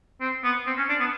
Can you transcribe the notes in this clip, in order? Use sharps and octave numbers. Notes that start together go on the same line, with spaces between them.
C4
B3
C4
C#4
D4
B3